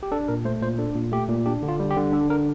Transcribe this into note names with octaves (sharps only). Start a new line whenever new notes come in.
G4
D4 A4
A#2 A#4
A3 C5
A#2 C5
D4 A4
A#2
A3 G4
A#2
D4 G4
D3
F4
G3
G4
D3
D4 A4
D3 A#4